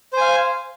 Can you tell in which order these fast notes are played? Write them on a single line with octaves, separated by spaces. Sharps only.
C5 G#5 F5